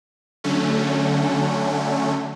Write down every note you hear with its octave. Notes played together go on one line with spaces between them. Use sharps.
D3 F#3 A3 C#4